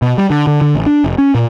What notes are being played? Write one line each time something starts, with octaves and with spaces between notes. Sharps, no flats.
B2
G3
D3
D3
D3
A1
D4
F1
C#4
A#2